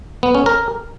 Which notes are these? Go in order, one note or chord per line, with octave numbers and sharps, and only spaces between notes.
B3
C#4
A#4